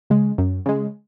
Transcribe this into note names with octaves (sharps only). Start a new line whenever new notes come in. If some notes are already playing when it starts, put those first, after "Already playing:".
C#3 G#3
F#2
C#3 G#3